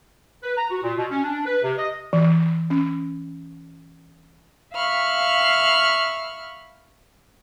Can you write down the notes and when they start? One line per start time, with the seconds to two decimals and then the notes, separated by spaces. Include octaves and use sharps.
0.43 B4
0.57 A#5
0.70 F#4
0.83 A#2
0.98 B2
1.10 C#4
1.24 D4
1.46 B4
1.63 C3
1.78 D#5
2.13 E3
2.70 C#4
4.73 E5 F5 B5 C#6 F6